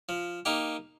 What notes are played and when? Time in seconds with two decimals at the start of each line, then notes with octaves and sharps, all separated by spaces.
0.09 F3
0.45 A#3 D#4 G4